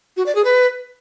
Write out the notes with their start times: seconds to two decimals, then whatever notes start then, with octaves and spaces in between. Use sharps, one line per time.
0.17 F#4
0.26 D5
0.35 G#4
0.45 B4